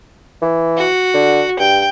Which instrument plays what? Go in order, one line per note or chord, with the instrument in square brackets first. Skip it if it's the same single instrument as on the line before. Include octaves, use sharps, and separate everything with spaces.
[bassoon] E3
[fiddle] F#4
[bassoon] D3
[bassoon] G2 [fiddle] G5